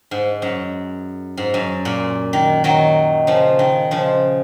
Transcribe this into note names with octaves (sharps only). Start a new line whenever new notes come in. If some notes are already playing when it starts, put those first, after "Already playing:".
G#2
F#2
G#2
F#2
A#2
D#3
D#3 F#3
C#3 F3
D#3
C#3 F3